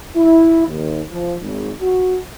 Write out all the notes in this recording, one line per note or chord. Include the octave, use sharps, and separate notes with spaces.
E4
D#2
F3
G#1
F#4